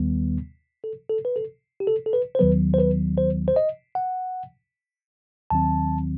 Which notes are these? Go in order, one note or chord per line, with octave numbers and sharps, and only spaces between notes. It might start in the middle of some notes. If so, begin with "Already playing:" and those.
Already playing: D#2 D#3 G3 B3
A4
A4
B4
A4
G4
A4
A4
B4
C5
D#2 D#3 F#3 B3 B4
C5
B4
C5
C5
D#5
F#5
D#2 D#3 F#3 C4 A5